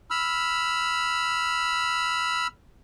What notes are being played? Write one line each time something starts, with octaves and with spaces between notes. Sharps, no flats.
B5 E6 F6